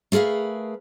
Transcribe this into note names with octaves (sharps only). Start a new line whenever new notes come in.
A3 G#4 A#4 B4 F5